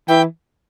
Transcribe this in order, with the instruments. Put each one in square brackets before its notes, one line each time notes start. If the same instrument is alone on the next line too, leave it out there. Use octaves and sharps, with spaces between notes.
[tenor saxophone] E3 [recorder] G5